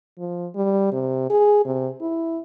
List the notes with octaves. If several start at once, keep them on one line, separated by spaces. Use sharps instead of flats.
F3
G3
C3
G#4
C3
E4